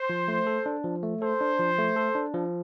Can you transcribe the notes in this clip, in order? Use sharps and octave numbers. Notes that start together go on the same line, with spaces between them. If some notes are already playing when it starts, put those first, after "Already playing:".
Already playing: C5
F3
A3
A4
D4
F3
A3
A4 C5
D4
F3
A3
A4
D4
F3